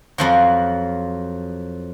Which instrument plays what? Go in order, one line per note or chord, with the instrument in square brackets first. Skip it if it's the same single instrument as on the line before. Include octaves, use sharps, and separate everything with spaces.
[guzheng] F2 F3 F#3